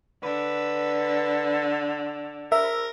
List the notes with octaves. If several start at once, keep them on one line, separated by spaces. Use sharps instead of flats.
D3 B4
A#4 E5